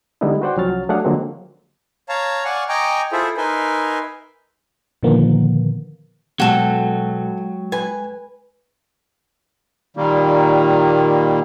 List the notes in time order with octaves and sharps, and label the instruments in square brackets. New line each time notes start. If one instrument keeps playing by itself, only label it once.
[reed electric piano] D3 G3 G#3 B3 D#4 E4
F#4 B4 C5 D5 F#5 G5
C2 F3 F#3 C#4 F6 A6
F#3 A3 D4 G#4 F5 F#5
D3 F3 F#3 G#3 A#3 C4
[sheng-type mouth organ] C#5 F5 A5 A#5
D5 F5 F#5 G#5 C#6
D#5 G5 G#5 A#5 C#6 D6
E4 F4 G#4 A4 C5 E5
D#4 A#4 B4 E5 G#5 C6
[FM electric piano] A#2 D3 D#3 F3 A#3 B3
[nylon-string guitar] B2 [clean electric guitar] F#3 [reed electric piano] G#3 G5 [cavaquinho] F#4 A4
[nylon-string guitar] B4 [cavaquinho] G#5
[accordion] A#2 D#3 G3 A#3